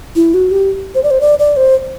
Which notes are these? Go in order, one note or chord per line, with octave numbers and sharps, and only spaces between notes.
E4
F#4
G4
C5
D5
C5
D5
D5
C5